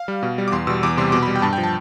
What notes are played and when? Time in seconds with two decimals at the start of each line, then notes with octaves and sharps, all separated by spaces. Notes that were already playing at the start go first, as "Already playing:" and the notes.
Already playing: F5
0.08 G3
0.23 B2
0.38 G3
0.48 D6
0.52 E2 C6
0.67 B2 G3 E6
0.83 E2 D6
0.97 C3 G3 C6
1.12 B2 D6
1.23 B5
1.28 G3
1.36 G5
1.42 G2 A5
1.53 G5
1.58 F3
1.63 A5